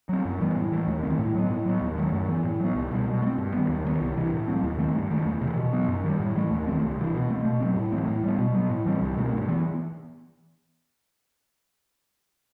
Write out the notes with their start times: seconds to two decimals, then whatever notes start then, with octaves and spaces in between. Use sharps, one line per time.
0.09 F#3 C4
0.25 F#2
0.41 E3 G3 B3
0.56 A2
0.72 E3 A3
0.87 D#2
1.03 D#3 A3 C4
1.19 A2
1.34 F#3 B3
1.50 A2
1.65 F#3 B3
1.81 D#2
1.97 D#3 F#3 A3
2.13 F#2
2.28 E3 B3
2.44 A2
2.60 F#3 B3
2.75 C2
2.91 B2 G3
3.07 B2
3.22 A3
3.27 C4
3.38 G2
3.54 D#3 G3 B3
3.69 D#2
3.85 D#3 F#3 B3
4.01 C2
4.16 C3 E3
4.32 A2
4.48 F#3 A3 C4
4.63 D#2
4.78 D#3 A3 C4
4.95 G2
5.10 D#3 A3
5.26 E2
5.41 C3 E3
5.57 B2
5.73 F#3 B3
5.88 F#2
6.04 D#3 G3
6.20 A2
6.35 E3 A3
6.51 D#2
6.67 D#3 A3 C4
6.83 C2
6.98 C3 E3
7.14 B2
7.29 A3 C4
7.45 B2
7.60 F#3 A3 C4
7.76 A2
7.92 E3 A3 C4
8.08 A2
8.23 G3 B3
8.39 B2
8.55 F#3 B3
8.70 A2
8.86 E3 G3 C4
9.01 C2
9.17 B2 A3 C4
9.32 G2
9.49 E3 B3